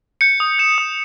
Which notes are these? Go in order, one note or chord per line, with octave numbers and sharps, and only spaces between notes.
G6 C#7
D#6
G6 E7
D#6